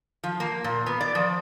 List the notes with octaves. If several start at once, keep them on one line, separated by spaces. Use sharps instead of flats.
F3
A#3
A#2
B3
D5
F3